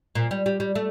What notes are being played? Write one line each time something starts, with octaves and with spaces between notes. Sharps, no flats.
A#2
G3
G3
G3
A3